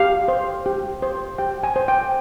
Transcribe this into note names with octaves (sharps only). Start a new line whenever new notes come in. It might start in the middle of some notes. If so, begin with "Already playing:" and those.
Already playing: G4 F5
C5
G4
C5
G4 G5
G#5
C5
G5